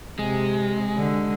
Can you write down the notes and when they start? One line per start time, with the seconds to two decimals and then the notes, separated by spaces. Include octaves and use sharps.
0.19 C3 G#3
0.96 D3